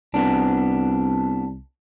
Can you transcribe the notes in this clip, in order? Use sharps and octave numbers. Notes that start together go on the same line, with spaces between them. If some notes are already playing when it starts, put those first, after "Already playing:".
C2 B3 D4